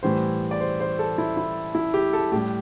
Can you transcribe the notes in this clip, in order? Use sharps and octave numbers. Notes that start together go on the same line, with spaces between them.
A2 E3 G3 C5
D5
C5
C5
A4
E4
E4
E4
G4
A4
A2 G3 G4